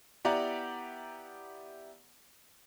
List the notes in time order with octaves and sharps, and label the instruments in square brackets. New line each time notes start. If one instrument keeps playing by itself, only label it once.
[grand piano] B3 E4 G4 D5 F#5 A#5